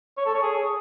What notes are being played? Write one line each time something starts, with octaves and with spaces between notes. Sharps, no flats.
C#5
A4
C#5
G#4